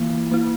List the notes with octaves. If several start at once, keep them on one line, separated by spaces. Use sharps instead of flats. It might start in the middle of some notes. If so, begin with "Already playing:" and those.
Already playing: E3 A#3 E4
A#3 E4